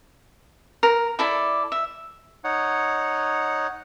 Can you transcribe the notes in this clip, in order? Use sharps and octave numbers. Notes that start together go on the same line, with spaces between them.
A#4
E4 A4 D5
E5
D#4 C#5 F#5